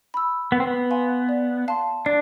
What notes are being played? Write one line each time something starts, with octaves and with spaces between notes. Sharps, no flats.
B5 E6
B3 B4
C4
B3
F5 G#5 C6
D5
F5 A5 C6
D4 D5